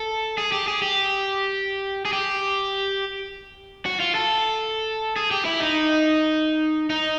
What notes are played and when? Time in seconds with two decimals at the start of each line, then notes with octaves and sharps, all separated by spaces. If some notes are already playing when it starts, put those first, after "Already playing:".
Already playing: A4
0.38 G#4
0.52 G4
0.68 G#4
0.82 G4
2.05 G#4
2.13 G4
3.86 F#4
4.00 F4
4.15 A4
5.16 G#4
5.31 G4
5.45 E4
5.60 D#4
6.90 D#4